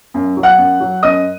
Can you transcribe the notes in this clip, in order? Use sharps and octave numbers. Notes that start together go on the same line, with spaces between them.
F#2
F#3
F#5 F#6
F#2
F#3
F#2 D#5 D#6